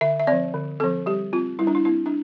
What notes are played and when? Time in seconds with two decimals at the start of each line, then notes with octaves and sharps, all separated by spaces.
0.01 D3 E5
0.19 E5
0.27 F3 C4 D5
0.54 D3
0.80 F3 C4 A4
1.06 G3 G4
1.33 C4 F4
1.59 G3 E4
1.67 D4
1.75 E4
1.85 C4 E4
2.06 D4